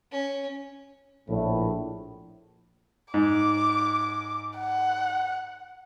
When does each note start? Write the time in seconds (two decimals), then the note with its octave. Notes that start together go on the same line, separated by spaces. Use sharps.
0.12 C#4
1.29 A#1 A2
3.14 G#2 D6
4.58 F#5